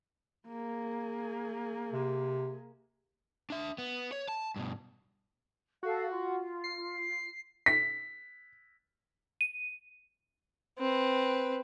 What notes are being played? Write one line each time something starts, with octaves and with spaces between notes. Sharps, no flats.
A#3 G#4
C3
D4 E5
B3
C#5
A5
G2 B2
F#4 A4 F5
F4
C7
B6
D#7
C4 B4